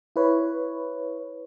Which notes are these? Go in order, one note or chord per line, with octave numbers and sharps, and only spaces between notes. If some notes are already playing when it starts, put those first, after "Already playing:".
E4 B4 C#5